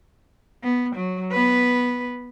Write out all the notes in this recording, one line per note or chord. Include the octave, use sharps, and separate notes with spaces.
B3
F#3
B3 B4